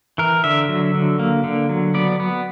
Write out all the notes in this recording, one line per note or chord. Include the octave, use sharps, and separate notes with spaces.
E3 A#4
D3 E5
F#3
D3
A#3
D3
F#3
B3 D5
B3